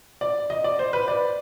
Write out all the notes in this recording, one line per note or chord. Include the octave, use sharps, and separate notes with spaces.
D5
D#5
D5
C5
B4
D5